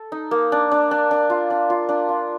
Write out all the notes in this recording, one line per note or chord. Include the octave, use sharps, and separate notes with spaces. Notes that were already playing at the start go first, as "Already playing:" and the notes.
Already playing: A4
D#4
A#3
D4
D4
D4
D4
F4
D4
F4
D4
F4